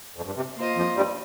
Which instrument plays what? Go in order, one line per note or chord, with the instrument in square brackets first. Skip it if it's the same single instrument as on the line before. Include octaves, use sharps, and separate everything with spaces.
[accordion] F2
G2
C3
[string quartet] A#3 F4 C5 D#5
[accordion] F2 F3
G2 G3